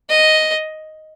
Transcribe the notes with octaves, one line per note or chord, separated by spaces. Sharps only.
D#5